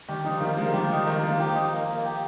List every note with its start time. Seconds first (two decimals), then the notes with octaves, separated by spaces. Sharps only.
0.08 D#3 G3 G4
0.25 F3 D#4
0.40 D#3 G3 A#3
0.57 F3 G#3 A#3
0.73 D#3 G3 G4
0.90 F3 D#4
1.07 D#3 A#3
1.23 F3 A#3
1.40 F3 G4
1.55 D#4
1.72 A#3
1.88 A#3
2.04 G4